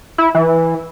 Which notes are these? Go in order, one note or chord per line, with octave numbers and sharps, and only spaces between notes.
E4
E3